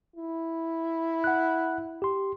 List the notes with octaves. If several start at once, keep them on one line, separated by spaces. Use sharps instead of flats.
E4
F#5 F#6
G4 C6